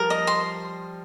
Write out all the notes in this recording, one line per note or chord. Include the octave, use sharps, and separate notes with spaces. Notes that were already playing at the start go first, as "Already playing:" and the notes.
Already playing: F3 G3 A#4
D#5
C6